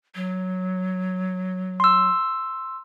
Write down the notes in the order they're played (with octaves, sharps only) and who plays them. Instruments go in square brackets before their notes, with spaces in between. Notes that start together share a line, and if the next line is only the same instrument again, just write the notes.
[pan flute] F#3
[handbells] C6 E6